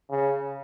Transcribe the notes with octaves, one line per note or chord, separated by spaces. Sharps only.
C#3